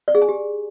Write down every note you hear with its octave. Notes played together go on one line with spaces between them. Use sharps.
D5
G#4
G#5
G4